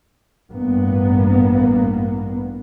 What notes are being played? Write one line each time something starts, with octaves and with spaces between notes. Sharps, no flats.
A1 G2 A#3 B3